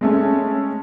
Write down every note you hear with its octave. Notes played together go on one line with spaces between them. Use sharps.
G#3 A3 C#4